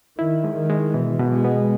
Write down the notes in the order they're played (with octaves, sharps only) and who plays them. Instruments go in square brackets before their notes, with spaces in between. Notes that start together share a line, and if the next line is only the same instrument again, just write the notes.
[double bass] D#3 [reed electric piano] E4
[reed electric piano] G#3
[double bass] D#3
[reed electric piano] G#3
[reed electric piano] B2 [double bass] E3
[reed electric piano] B2
[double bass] G#3
[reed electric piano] B3